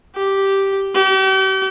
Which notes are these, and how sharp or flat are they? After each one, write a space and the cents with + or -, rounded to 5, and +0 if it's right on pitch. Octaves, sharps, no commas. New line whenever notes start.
G4 -5
G4 -40